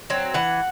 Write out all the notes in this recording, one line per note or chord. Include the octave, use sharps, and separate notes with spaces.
F#3 C4
E3 F#5